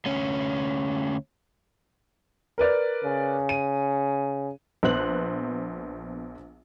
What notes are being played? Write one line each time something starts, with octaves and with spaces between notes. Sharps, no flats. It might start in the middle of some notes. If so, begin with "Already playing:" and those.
D2 C#4
A#4 B4 D5
C#3
D#7
A#1 B3 C5 F#6 F#7